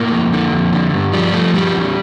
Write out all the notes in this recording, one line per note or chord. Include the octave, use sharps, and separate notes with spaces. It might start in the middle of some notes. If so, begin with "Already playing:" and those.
Already playing: A2 A#3
F2
D3
F2
D3
G2
F3 G3
F3 A3
G2 G3
E2